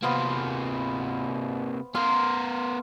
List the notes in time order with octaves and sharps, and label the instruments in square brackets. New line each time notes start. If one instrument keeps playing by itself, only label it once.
[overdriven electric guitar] C3 A#3 [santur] B3 C5 F5
[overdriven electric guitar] B3 A#4 [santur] F5 C6 D#6